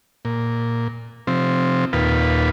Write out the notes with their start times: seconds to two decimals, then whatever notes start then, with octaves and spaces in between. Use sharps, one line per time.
0.25 A#2
1.27 C3 F3 C4
1.93 D#2 A#2 F4 B4